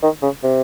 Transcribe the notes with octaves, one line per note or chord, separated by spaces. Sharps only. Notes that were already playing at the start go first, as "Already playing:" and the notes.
D#3
C#3
C3